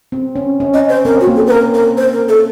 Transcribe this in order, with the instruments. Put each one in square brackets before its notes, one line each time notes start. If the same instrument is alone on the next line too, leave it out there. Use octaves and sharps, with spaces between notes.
[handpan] C4
C#4
C#4
[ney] D#5
C5
[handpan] C4 [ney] A#4
[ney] F#4
[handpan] A#3
[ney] A4
C5
A#4
A#4
C5
A#4
A4